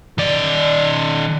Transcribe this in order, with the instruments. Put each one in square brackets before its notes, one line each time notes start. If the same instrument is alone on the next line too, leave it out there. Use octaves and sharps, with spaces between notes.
[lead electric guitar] D#3 D5